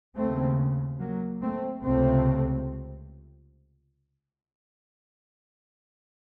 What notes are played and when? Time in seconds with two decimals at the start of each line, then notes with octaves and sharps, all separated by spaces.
0.16 D#2 C#3 A3 C4
0.99 F#3 A#3
1.42 A3 C4
1.84 C#2 C3 A3 C4